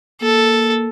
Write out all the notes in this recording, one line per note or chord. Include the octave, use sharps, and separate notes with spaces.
A#3 A4